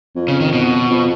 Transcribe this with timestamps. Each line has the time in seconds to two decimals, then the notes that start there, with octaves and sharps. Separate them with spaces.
0.16 F2
0.28 C#3
0.40 D#3
0.53 B2
0.89 F2